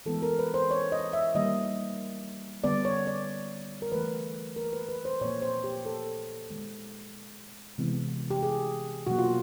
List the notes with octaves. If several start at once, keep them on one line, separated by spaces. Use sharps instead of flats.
E3 G#3 B3 A4
A#4
B4
C5
C#5
D#5
E5
D#3 G3 A#3 D#5
D3 G3 B3 D5
C#5
D5
A#4
E3 A3 B4
A#4
B4
B4
C5
A#2 F3 A#3 C#5
C5
G4
A4
D#3 G#3 B3
C3 E3 G#3 B3
G4
G#4
B2 F#3 A#3 F#4
F4